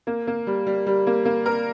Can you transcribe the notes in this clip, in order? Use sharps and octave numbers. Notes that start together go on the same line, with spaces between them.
A#3
A#3
G3
G3
G3
A#3
A#3
A#4